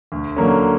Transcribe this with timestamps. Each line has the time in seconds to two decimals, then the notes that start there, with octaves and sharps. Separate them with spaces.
0.12 D2
0.37 D3 F#3 A#3 C#4